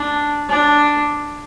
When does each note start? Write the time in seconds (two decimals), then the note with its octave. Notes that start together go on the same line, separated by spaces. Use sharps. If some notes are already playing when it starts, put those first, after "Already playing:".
Already playing: D4
0.49 D4